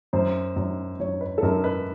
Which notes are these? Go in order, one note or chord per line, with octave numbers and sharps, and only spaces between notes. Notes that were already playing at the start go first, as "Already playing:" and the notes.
F#2 C5
F#2
F#2 C#5
B4
A4
F#2 A#4
B4